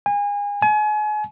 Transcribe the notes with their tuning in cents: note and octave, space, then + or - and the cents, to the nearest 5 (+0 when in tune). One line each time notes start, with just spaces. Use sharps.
G#5 -30
G#5 +35